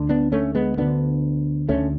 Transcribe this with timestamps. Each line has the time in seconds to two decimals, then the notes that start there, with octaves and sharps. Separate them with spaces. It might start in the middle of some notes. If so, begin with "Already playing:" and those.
Already playing: D2 D3
0.09 B3 D4
0.32 A3 C#4
0.55 G#3 B3
0.78 D2 D3 B3 D4
1.69 D2 D3 A3 C#4